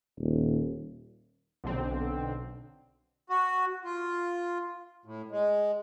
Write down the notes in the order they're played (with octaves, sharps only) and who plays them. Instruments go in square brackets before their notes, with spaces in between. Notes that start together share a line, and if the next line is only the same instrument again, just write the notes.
[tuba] D#1
[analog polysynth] B1 D3 C4
[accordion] F#4
F4
A2
G#3